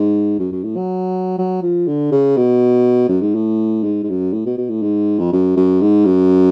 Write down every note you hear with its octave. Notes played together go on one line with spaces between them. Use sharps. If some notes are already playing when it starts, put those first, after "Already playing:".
Already playing: G#2
F#2
F#2
A2
F#3
F#3
F3
D3
C#3
B2
F#2
G#2
A2
G#2
G#2
F#2
A2
B2
B2
A2
G#2
F2
F#2
F#2
G#2
F#2